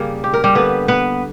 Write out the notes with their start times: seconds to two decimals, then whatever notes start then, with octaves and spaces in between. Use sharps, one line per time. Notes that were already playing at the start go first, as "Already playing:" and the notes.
Already playing: C#3 G3 A#3
0.24 G4
0.34 A#4
0.44 G3 G4
0.55 D3 G3 A#3 B3 B4
0.88 B3 B4